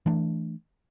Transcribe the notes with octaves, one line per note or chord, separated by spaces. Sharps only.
E3 A3 D4